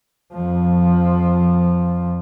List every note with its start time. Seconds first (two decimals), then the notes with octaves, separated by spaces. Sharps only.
0.32 F2 F3